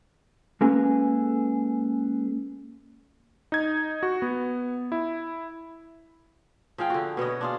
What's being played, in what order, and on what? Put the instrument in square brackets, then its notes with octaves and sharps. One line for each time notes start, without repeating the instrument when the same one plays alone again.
[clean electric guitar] G#3 A#3 C#4 G#4 A4 B4
[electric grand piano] D#4 G#6
F#4
B3
E4
[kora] F3 G#4 F5 G5
D3 F#4
B2 B3 C#5 D#5
D4 F4 G#4